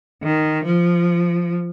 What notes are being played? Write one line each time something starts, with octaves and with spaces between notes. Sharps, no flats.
D#3
F3